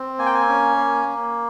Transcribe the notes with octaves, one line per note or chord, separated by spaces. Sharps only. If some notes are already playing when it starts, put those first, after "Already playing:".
Already playing: C4
A#3 G#5
G5
G#5
C#4
A#3
A#3